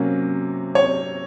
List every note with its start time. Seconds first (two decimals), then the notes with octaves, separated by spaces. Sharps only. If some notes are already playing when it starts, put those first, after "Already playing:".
Already playing: C3 F#3 A#3 C#4
0.75 C#5